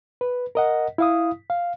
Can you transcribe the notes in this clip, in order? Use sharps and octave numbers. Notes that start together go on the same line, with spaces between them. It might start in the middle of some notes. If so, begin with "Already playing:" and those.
B4
A#4 D#5 F#5
E4 F5 D#6
F5